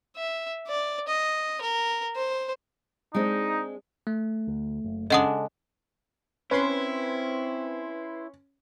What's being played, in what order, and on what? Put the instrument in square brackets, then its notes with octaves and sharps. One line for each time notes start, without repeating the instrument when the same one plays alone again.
[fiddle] E5
D5
D#5
A#4
C5
[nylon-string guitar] G#3 C4 D4 [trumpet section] D#4
[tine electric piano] A3
[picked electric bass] D2
F#1
[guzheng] C#3 G#3 D4 [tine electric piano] A4 [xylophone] D#5 F#5 D#6
[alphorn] C4 [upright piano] C#4 [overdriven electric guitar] E4 [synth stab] B4 C6